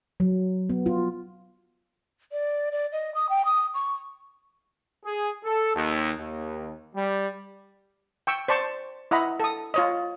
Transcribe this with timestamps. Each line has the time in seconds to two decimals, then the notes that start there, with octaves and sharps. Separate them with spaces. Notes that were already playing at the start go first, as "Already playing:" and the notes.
0.20 F#3
0.70 B3
0.86 F4
2.32 D5
2.72 D5
2.92 D#5
3.15 D#6
3.29 G5
3.45 D#6
3.74 C#6
5.04 G#4
5.44 A4
5.75 D#2
6.20 D#2
6.95 G3
8.27 G5 C#6 E6
8.48 C5 D5 A5 C#6
9.11 E4 D#5 F#5 A#5 B5
9.40 A4 D#6
9.74 F4 C#5 D#5